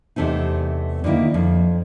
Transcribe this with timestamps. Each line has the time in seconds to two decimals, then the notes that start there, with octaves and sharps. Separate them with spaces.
0.16 E2 C3 A3 C4 D#4
1.04 D3 D#3 G#3 A#3 E4
1.34 F2